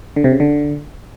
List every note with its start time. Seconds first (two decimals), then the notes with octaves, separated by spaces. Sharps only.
0.16 D3
0.24 C3
0.32 C#3
0.40 D3